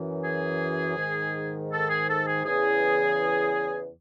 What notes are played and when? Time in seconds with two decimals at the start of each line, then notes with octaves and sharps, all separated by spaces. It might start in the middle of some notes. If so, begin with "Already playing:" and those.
Already playing: F#2 E3
0.23 G#4
0.96 G#2 D#3
1.71 A4
1.89 G#4
2.08 A4
2.26 G#4
2.45 E2 C#3 E3 G#4